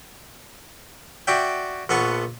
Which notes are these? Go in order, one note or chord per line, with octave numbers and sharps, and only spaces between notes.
F#4 D5 E5 G5
A#1 B3 A4 F#5 C#6